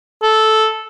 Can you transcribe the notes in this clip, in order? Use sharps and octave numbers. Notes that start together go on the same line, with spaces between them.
A4